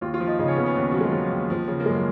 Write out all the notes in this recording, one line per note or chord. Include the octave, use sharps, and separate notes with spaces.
D#2 F4
F4
F3
D#4
C#3 D#4
C#4
C#3 B3
C#4
D#2 B3
F3 F#3
G#3
F3
D#2
F3
C#3
A#3
F#2 G#3